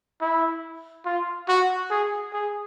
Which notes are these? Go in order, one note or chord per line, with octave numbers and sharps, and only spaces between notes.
E4
F4
F#4
G#4
G#4